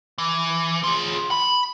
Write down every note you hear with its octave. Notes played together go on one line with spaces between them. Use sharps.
E3
F4 G#4
B5